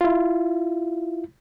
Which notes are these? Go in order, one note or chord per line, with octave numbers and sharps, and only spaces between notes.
E4 F4